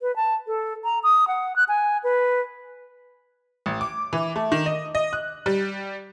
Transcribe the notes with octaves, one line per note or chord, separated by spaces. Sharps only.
B4
A5
A4
A#5
D#6
F#5
F#6
G#5
B4
A1
D6
E3
A3
D#3
D#5
D#5
F#6
G3